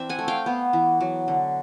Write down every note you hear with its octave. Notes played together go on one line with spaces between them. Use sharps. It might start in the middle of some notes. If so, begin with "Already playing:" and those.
Already playing: E3 C4 D4 E5
F#5 G#5
A3
F5 G5
B3
E3
F#3
D3